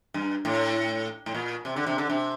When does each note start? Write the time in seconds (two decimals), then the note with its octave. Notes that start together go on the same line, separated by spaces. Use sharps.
0.14 G2
0.45 A2
1.26 A2
1.34 A#2
1.65 C3
1.76 D3
1.87 C3
1.98 D3
2.10 C3